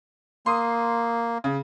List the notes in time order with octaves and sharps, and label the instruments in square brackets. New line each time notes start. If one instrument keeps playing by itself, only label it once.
[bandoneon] A#3 [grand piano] C6 D#6
[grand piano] C#3